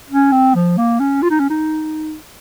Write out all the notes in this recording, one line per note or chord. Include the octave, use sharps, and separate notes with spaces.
C#4
C4
F3
A#3
C#4
F4
D#4
C#4
D#4